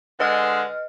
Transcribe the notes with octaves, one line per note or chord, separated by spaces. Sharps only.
D3 G#3 B4 D#5 F6